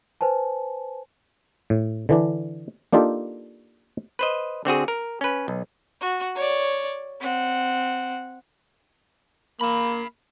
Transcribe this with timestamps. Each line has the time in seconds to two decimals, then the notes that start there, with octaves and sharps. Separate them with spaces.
0.21 B4 C5 G#5 A5
1.70 A2
2.09 D3 E3 D4
2.93 A#3 D4 D#4 F4 G4 A4
4.19 B4 C5 D#5
4.65 D3 C4 F#4 G#4
4.88 A#4
5.21 C#4 B4
5.48 B1
6.01 F#4
6.35 C#5 D5
7.20 C4 F#5
9.61 A#3 F5 B5